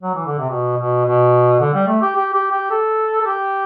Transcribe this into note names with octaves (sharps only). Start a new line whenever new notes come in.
F#3
E3
D3
C3
B2
B2
B2
D3
G3
A3
G4
G4
G4
G4
A4
A4
G4